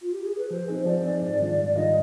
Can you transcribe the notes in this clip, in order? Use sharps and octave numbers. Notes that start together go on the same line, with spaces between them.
F4
G4
G#4
B4
F3 C5
C4 D#4 G#4
F3 D5
C4 D#4 G#4
G#2
D#3 G3 D4 F4
G#2 D5
D#3 G3 D4 F4 D#5